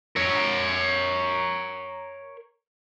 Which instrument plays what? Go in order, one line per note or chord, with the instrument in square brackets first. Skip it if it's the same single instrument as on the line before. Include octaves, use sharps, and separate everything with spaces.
[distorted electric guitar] A#4 C#5